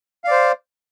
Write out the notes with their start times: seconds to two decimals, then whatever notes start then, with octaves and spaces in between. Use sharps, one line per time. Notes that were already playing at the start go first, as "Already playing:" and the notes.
0.24 F5
0.28 D5
0.31 C5